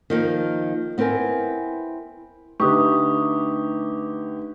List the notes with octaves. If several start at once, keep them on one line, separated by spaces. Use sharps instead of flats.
D#3 F3 A#3
B3 C4 E4 A#4 G#5
D3 A3 D#4 G4 B4 C#6 D#6